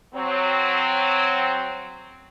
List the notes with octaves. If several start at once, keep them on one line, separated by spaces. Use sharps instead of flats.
F#3 C4